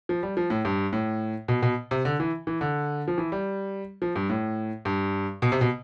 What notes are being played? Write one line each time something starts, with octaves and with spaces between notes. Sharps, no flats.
F3
G3
F3
A2
G2
A2
B2
B2
C3
D3
E3
E3
D3
F3
E3
G3
F3
G2
A2
G2
B2
C3
B2